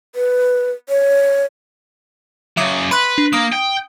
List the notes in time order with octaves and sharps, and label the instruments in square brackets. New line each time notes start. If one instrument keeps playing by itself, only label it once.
[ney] B4
C#5
[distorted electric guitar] C#3 F#3 [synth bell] E5 D6 D#6
[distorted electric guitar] B4 [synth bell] B5 C6 F#6
[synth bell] D4
[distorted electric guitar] A#3 [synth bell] D#6
[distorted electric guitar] G5